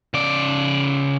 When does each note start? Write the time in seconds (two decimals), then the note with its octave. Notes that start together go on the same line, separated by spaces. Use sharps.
0.14 C#3 D5